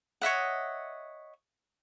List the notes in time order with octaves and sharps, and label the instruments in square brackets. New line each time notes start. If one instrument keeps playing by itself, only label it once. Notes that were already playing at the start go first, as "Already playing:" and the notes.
[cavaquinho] C#5 D#5 E5 F#5